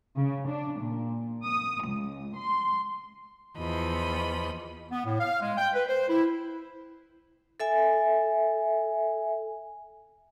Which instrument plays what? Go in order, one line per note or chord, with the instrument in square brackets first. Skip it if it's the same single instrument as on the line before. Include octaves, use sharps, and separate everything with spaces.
[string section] C#3
D4
A#2
D#6
C#2
C6
[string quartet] E2 F3 D#5 B5
[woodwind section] B3
A2
F5
G#3
G5
B4
C5
E4
[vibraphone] A4 E5 G#5